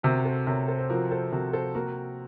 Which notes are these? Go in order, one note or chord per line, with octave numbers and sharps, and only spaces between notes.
C3 F#4 A#4
A4 C5
C3 A#4 C#5
A4 C5
C5
F3 F#4 A#4
A4 C5
C3 F#4 A#4
A4 C5
A#3 F#4 A#4